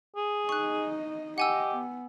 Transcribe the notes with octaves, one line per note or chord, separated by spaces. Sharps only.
G#4
D#4 D#5 C#6 F#6
G4 D#5 F#5 G#5 E6
B3